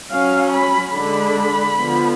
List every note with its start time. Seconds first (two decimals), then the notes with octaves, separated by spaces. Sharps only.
0.11 F#3 C#4 F5
0.53 B5
0.94 D3 G#3 D4 B5
1.77 D3 F3 B3